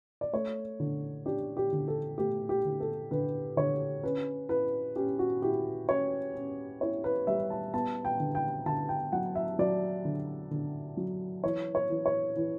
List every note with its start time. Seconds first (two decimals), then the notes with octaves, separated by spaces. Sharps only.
0.21 D5
0.33 A3 C#5
0.80 D3
1.26 D4 G4
1.57 G4
1.72 D3
1.88 A4
2.18 A3 G4
2.49 G4
2.65 D3
2.80 A4
3.11 D3 B4
3.57 D3 C#5
4.03 C#4 B4
4.49 E4 B4
4.96 C#4 G4
5.19 F#4
5.42 E4 G4
5.89 C#4 C#5
6.35 C#4
6.81 E4 C#5
7.04 B4
7.27 G3 E5
7.50 A5
7.73 B3 A5
8.05 G5
8.20 D3
8.35 G5
8.66 D3 A5
8.89 G5
9.12 F#3 F#5
9.35 E5
9.59 F#3 D5
10.05 D3
10.51 D3
10.97 F#3
11.44 E3 C#5
11.75 C#5
11.90 E3
12.06 C#5
12.36 E3